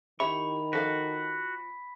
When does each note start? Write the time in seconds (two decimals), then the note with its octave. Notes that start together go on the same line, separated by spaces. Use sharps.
0.20 D#3 E4 G4 E5 B5 C#6
0.73 F3 F#4 A4 F5 B6